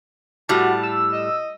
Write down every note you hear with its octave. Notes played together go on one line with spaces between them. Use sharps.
A2 G3 F#4 A5
E6
D#5